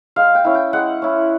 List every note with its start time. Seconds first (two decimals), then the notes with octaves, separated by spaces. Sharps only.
0.16 G#3 F5
0.35 G5
0.45 C#4 E4
0.55 G5
0.73 G#3 F#5
1.02 C#4 E4